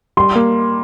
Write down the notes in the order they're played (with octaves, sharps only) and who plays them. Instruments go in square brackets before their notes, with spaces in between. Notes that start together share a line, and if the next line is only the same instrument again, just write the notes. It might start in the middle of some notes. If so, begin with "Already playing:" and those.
[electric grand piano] G3 [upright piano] C6
[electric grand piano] A#3